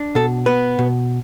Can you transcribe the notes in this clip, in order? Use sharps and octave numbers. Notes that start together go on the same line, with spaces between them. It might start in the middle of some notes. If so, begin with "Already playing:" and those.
Already playing: D4
B2 A4
B3 B4
B2